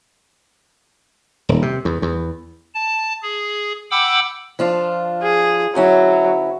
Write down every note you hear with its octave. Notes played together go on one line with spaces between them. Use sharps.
D#1
C3
E2
E2
A5
G#4
F#5 G5 B5 D6 E6
F3 D4 F4
G#4
D2 F#3 C#4 E4